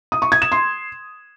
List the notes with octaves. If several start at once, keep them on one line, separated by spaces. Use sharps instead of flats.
D#6
C#6
G#6
E7
C6